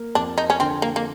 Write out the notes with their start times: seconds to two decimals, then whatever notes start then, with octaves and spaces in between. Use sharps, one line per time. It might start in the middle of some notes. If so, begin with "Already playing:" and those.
Already playing: A#3
0.15 F2 D4
0.38 D#4
0.50 C#4
0.60 D3 C4
0.82 A#3
0.96 A#3